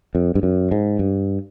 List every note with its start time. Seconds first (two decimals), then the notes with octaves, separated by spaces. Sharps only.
0.15 F2
0.35 G2
0.43 F#2
0.71 G#2
0.99 G2